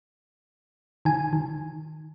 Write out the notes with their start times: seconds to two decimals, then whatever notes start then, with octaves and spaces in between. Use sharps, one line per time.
1.05 D#3 G#5
1.33 D#3